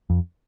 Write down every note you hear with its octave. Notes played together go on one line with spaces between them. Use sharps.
F2